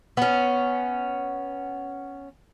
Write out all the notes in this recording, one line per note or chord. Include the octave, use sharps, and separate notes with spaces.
B3 C#4